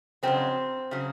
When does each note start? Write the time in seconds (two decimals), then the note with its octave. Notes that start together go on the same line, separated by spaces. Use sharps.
0.23 F2 C#3 F#3 C4
0.91 C#3 F#3